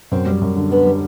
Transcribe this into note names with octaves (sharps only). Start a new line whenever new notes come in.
F#2 C4
G3
F#2
D3
D3 B3
G3